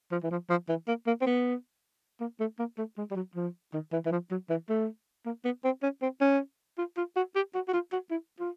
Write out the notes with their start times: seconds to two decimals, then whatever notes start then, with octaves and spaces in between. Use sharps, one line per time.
0.12 F3
0.23 E3
0.31 F3
0.50 F3
0.69 E3
0.88 A#3
1.07 A#3
1.22 C4
1.26 B3
2.21 A#3
2.40 A3
2.59 A#3
2.78 A3
2.98 G#3
3.11 G3
3.16 F#3
3.36 F3
3.74 D#3
3.93 E3
4.06 E3
4.12 F3
4.31 F#3
4.50 E3
4.69 A3
5.26 A#3
5.45 B3
5.65 C4
5.83 C#4
6.02 C4
6.21 C#4
6.78 F4
6.98 F4
7.16 F#4
7.36 G4
7.55 F#4
7.69 F#4
7.74 F4
7.93 F#4
8.11 E4
8.40 F4